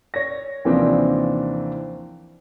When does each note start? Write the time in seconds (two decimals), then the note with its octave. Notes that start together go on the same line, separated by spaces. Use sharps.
0.14 C#5 A#6
0.65 D#2 C3 E3 F3 C4 D4